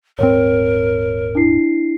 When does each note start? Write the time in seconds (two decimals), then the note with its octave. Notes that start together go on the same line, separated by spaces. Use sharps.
0.19 D#1 G#2 C4 A#4 C#5
1.35 D4 E4 C7